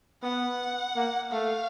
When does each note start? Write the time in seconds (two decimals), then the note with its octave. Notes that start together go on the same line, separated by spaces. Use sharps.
0.23 B3 F#5
0.96 A#3
1.32 A3 F5